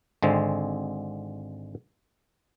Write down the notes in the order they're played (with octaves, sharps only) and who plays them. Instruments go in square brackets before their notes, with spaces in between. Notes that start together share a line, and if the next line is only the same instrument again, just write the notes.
[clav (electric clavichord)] G#1 D3 G#3 C4